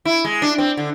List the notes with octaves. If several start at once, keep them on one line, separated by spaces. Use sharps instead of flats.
E4
G#3
D4
C4
D3